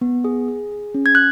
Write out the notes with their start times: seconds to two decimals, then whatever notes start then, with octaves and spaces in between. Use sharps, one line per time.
0.01 B3
0.24 G#4
0.48 G#4
0.72 G#4
0.95 C#4
1.06 G#6
1.15 F#6